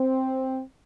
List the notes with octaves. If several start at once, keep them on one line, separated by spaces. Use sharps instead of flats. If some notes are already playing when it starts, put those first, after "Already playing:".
Already playing: C4